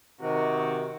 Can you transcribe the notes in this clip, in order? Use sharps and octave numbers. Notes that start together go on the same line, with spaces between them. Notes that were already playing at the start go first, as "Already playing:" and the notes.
C3 D#3 F#4